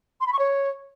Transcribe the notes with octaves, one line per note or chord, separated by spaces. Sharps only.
C6
B5
C#6
C#5